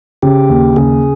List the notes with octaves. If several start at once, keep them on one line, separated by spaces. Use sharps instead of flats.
C#3 G4
D#2
C#3 G#4